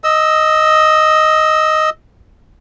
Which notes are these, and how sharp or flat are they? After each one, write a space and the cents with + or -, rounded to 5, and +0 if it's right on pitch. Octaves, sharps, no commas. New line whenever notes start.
D#5 +0 E6 -15